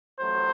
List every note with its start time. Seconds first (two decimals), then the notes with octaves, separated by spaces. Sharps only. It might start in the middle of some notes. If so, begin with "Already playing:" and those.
0.20 A1 A2 F#3 C5